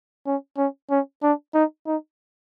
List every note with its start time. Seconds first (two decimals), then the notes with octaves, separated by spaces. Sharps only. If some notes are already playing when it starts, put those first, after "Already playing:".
0.26 C#4
0.57 C#4
0.90 C#4
1.23 D4
1.54 D#4
1.86 D#4